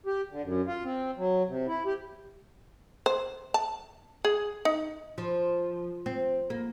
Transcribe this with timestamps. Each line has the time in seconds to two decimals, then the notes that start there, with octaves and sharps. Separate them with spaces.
0.06 G4
0.31 D3
0.43 F#2
0.67 F4
0.84 C4
1.17 F#3
1.48 C3
1.67 E4
1.86 G4
3.06 C5
3.54 A5
4.25 G#4
4.65 D#4
5.18 F3
6.06 C4
6.50 A#3